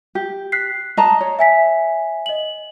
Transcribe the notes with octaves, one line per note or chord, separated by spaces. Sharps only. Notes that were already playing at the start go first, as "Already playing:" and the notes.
G4
F#6 B6 C7
D#5 A5 A#5
C#5
E5 G#5 B6
D#5 F#7